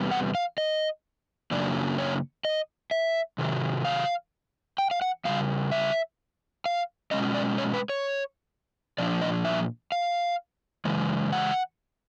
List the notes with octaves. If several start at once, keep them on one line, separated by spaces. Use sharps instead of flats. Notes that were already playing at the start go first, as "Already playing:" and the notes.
Already playing: E2 C3 G3 B3
F#5
F5
D#5
F#2 C#3 F#3 A#3 D4 D5
C#5
D#5
E5
C3 D#3 F#3
F5
G5
F5
F#5
C#3 E3 G3 F5
E5
F5
B2 G#3 C#4 D#5
D5
C#5
B4
C#5
A#2 F3 A#3 D4 D5
D#5
E5
F5
C#3 E3 G#3
F#5